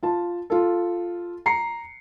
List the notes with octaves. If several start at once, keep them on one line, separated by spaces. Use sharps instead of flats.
F4 A5
F4 A4
A#5 C7 C#7